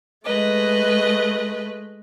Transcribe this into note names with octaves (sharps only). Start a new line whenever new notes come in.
G#3 A3 B4 D#5